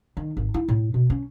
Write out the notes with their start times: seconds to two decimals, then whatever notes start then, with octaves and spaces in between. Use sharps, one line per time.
0.17 D#3
0.37 G#1
0.54 E4
0.68 A2
0.94 B2
1.10 C#4